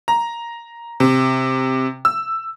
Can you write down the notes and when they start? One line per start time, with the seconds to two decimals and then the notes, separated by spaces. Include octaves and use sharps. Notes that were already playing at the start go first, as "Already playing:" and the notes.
0.08 A#5
1.00 C3
2.05 E6